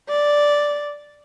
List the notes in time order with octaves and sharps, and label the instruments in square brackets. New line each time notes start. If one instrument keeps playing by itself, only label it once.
[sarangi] D5